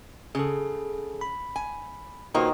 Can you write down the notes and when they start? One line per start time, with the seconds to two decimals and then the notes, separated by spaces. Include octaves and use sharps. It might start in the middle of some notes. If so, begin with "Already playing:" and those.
0.35 C#3 G#4 A4
1.21 B5
1.56 G#5
2.34 A#2 D#3 A#3 F4 F#4 B4 C5